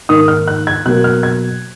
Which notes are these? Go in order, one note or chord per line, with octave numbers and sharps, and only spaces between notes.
G#2 D#3 A#3 D#6
F6
F#6
G#6
B2 F#3 A#3 F#6
F6
G#6